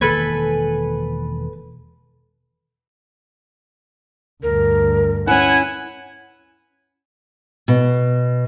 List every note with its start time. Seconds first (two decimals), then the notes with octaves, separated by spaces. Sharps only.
0.01 E1 D#3 A#3 A4 B4 G#5
4.43 D2 G2 A#4
5.27 C#4 E4 B4 F#5 G#5
7.68 B2